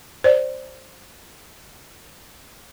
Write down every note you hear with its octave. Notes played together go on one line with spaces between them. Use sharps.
C5 D5